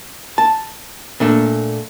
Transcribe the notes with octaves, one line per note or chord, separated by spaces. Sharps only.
A5
A#2 A3 D4